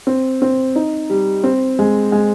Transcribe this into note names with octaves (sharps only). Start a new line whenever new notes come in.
C4
C4
D#4
G3
C4
G#3
G#3